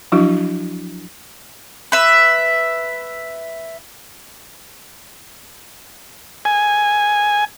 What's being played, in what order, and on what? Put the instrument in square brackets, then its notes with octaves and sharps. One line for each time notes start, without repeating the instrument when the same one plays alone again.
[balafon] F3 F#3 D4 E4 F#4
[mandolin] B4 E5
[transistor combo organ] G#5